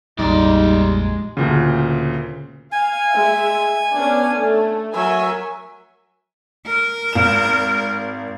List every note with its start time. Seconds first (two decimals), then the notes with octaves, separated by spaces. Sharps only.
0.19 A#1 F2 G3 G#3 D#4 D5
1.37 D2 A#2 C#3
2.72 F5 G#5
3.13 G#3 E5
3.94 B3 C#4 D4
4.36 A3
4.96 F#3 A#4 E5 G#5
6.66 A#4
7.13 G#1 E7